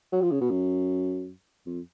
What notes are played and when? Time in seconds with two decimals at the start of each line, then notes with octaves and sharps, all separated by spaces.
0.12 F#3
0.22 F3
0.31 C#3
0.41 B2
0.50 F#2
1.66 F2